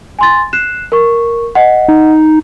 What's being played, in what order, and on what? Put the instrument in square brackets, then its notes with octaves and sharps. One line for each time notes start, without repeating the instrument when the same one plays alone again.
[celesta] G#5 C6 A6
F#6 C7 E7
A#4 C#6
D#5 F#5
[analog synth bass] D#4